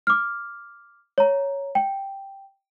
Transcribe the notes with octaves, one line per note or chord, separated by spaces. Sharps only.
D6 F6
C#5 A#5
G5